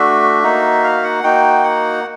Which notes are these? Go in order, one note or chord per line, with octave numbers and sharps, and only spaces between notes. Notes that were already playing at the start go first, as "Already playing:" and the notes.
Already playing: A3 D4 F#4 E5
A#3 D#4 F#4
F5
F#5
A#3 D#4 F#4 G5
F#5